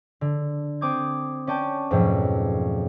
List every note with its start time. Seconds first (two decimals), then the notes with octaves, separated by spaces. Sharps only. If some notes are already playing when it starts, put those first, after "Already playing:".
0.21 D3
0.81 C4 D6 D#6 G#6
1.47 C#4 D5 G5 A5
1.91 F2 G#2 B2 F3 F#3 A3